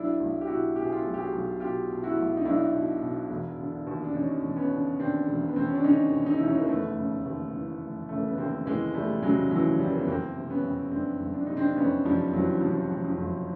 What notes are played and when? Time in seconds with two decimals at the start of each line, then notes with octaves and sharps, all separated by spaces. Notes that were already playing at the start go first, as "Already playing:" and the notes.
Already playing: B1 D4 E4
0.20 B1
0.41 G4
0.47 B2 E4 F#4
0.76 B2 G4
0.85 G#4
0.92 F4 G4
1.05 B1
1.14 G4
1.18 F#4 G#4
1.32 B1
1.60 B2 F4 G4
1.89 B2
2.03 E4 F#4
2.17 B1
2.37 D#4
2.45 B1 D4 E4
2.74 B2
3.02 B2
3.30 E1
3.58 D3
3.87 D#2
4.04 D4
4.15 E1 C#4 D#4
4.42 E1
4.57 B3 C#4
4.71 D3
4.99 D#2 C4 D4
5.28 E1
5.48 B3
5.56 E1 C4
5.65 C#4
5.75 D4
5.84 D3 C#4 D#4
6.12 D#2
6.26 D#4
6.35 E4
6.41 E1 C#4 D#4
6.58 A#3
6.68 F1 A3 B3
6.97 C#3
7.26 D#2
7.53 E3
7.82 F1
8.09 C#3 A3
8.18 A#3
8.28 B3
8.38 D#2 A#3 C4
8.66 E3 G#3 A#3
8.94 F1 G3 A3
9.23 C#3 F#3 G#3
9.51 D#2 E3 F#3
9.79 E3 F3 G3
9.91 A#3
9.99 B3
10.07 F#1 A#3 C4
10.36 C3
10.49 B3 C#4
10.64 F2
10.92 F#1 C4 D4
11.20 F#1
11.34 D4
11.47 C3 D#4
11.57 C4 D4
11.76 F2 B3 C#4
12.05 F#1 F3 G3
12.33 F#1 E3 F#3
12.61 C3 F3
12.90 F2
13.04 F3
13.18 F#1